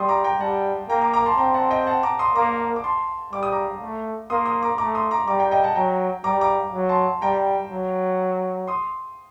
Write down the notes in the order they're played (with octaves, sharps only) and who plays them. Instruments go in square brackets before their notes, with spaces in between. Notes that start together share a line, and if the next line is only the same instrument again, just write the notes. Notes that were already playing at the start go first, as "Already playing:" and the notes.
Already playing: [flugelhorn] G3 [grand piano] C6 D#6
[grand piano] A#5 D6
G5 A#5
[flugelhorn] G3 [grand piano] F#5 A5
[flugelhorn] A#3 [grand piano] G5 A#5
[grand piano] A#5 D6
A#5 D6
A5 C6
[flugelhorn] C4 [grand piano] G5 A#5
[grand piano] F#5 A5
D#5 G5
F#5 A5
A#5 D6
C6 D#6
[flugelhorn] A#3 [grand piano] A#5 D6
[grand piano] D6
A5 C6
[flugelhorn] G3 [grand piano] D6
[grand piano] D#6
A#5 D6
[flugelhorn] A3
[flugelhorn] A#3 [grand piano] C6 D#6
[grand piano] C6 D#6
A#5 D6
[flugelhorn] A3 [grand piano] A#5 D6
[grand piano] C6 D#6
A#5 D6
[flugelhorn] G3 [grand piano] A#5 D6
[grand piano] G5 A#5
D#5 G5
F#5 A5
[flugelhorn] F#3 [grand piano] G5 A#5
[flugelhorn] G3 [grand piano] A#5 D6
[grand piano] A#5 D6
[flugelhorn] F#3
[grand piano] A5 C6
[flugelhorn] G3 [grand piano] G5 A#5
[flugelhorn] F#3
[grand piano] C6 D#6